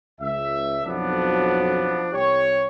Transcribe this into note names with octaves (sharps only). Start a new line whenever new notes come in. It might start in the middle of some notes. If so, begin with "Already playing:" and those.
C#2 E5
B1 F2 F3 F#3 B3 D4
C2 G4 C#5